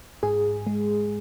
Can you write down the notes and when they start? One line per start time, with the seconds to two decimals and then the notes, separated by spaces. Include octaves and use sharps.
0.23 G#2 G#4
0.67 G#3